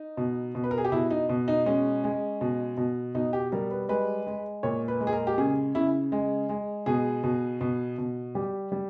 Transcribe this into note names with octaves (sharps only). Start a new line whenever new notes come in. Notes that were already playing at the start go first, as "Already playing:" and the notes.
Already playing: D#4
B2
B2
B4
A#4
G#4
G4
B2 E4
D#4
B2
D#4
G#3 C#4
G#3
B2
B2
B2 D#4
G4
G3 A#4
B4
G#3 B4
G#3
A#2 C#5
B4
G#3
G#4
A#4
G4
C#3 G#4
C#3 E4
G#3
G#3
B2 G#4
B2
B2
B2
G3 G4
G3